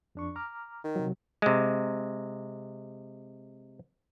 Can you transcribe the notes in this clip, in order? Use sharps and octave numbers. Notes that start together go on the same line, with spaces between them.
F2 D4 C#6
A#5 D6 F6
D#3
C3 F#3
C3 G#3